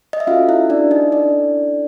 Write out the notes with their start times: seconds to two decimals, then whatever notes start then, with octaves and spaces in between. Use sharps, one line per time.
0.13 D#5
0.20 E5
0.27 C#4 F4 F#4 A4 F5
0.49 E4 E5
0.70 D4 D5
0.91 D#4 D#5
1.12 C#4 D4 E4 A4 D5